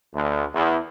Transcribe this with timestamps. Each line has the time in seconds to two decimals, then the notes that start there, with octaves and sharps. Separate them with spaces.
0.14 D2
0.54 E2